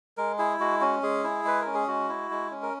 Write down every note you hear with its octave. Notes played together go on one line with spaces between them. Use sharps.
G#3 A#4
E4 G#4
G#3 F#4
C#4 F#4
G#3 G#4
E4
G#3 B4
C#4 A#4
G#4
G#3 F#4
E4
G#3
C#4
A#4